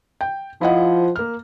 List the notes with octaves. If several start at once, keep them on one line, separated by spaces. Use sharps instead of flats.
G5
F3 E4 D#5 F#5
A#3 F6